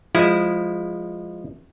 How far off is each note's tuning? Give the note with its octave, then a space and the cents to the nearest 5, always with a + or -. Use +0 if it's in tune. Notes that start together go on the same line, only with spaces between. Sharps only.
F3 +0 G#3 -15 E4 +0